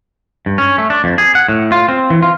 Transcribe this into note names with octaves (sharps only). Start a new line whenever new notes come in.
G2
C#4
A3
D4
F2
G#4
F#5
A2
F4
C4
E3
F4